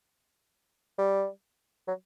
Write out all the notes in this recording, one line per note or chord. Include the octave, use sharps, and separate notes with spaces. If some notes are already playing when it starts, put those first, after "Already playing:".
G3
F#3